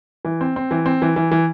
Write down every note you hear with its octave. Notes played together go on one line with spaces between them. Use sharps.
E3
C4
C4
E3
C4
E3
E3
E3